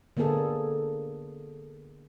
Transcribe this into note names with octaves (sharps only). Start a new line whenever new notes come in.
D3 A#3 B3 G#4 A4